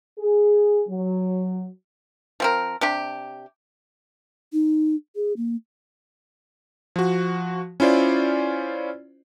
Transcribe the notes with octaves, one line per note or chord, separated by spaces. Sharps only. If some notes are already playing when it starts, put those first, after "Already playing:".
G#4
F#3
F3 C4 A#4
C3 D4 G4
D#4
G#4
A#3
F3 F#4
C#4 E4 F4 C5 D5